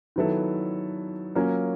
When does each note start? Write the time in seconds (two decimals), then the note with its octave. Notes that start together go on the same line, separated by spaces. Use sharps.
0.16 D#3 F#3 B3 E4 A4
1.35 F#3 A#3 C#4 F4 A#4